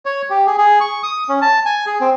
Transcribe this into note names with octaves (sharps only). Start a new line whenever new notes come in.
C#5
G4
G#4
G#4
C#6
D#6
C#4
A5
G#5
G#4
C4